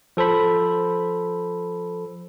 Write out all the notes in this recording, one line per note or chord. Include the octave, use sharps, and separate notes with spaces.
F3 A4 C5 B5